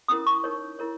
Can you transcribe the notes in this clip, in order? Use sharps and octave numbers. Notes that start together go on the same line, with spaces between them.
C#4 E4 A#4 D#6
C#6
D#4 A#4 C#5
E4 A#4 C#5